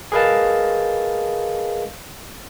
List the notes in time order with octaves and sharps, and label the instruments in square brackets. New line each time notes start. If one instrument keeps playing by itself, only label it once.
[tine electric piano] G#4 A#4 B4 D#5 F5 A5